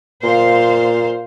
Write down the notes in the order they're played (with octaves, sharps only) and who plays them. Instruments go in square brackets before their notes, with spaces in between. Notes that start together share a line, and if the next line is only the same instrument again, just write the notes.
[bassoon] A#2 [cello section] C5 F5